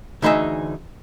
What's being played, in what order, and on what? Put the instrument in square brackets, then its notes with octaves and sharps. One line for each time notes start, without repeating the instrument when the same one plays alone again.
[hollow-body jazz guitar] D2 E3 D#4 G#4 E5